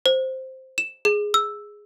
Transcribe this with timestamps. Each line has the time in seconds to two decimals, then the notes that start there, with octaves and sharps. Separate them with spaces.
0.06 C5
0.78 E7
1.05 G#4
1.34 E6